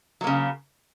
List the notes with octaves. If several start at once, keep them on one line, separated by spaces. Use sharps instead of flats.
C#3 F#3 A#3